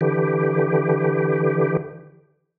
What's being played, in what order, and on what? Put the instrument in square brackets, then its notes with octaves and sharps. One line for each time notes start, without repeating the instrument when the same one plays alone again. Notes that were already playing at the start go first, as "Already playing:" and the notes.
[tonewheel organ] D3 E3 G4